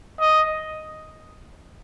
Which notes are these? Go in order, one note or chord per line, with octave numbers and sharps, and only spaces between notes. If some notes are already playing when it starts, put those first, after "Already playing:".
D#5